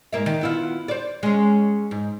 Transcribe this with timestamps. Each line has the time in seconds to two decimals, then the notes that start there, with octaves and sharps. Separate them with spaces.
0.13 G#2 A#3 E5
0.26 D#3
0.41 B3 E4 F4
0.88 C5 D5
1.23 G#3 C#4
1.91 G#2